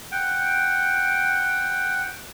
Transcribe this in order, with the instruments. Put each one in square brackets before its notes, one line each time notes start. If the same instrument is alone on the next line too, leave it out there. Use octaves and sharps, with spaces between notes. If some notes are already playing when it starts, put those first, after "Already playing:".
[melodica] F#5 G5